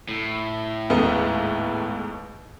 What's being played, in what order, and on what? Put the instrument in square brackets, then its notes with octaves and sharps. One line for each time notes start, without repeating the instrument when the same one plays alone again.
[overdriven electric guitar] A2
[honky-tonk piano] D#2 G#2 B3